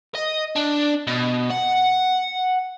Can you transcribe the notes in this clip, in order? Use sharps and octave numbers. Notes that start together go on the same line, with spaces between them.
D#5
D4
B2
F#5